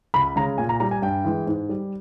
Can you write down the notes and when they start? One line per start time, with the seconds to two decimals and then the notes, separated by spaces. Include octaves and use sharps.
0.14 C#2 B5
0.36 C#3 G#3 A#5
0.58 A#2 G#5
0.69 A#5
0.80 G3 A#5
0.91 G#5
1.02 G2 G5
1.24 E3 G#3
1.47 G#2
1.69 G3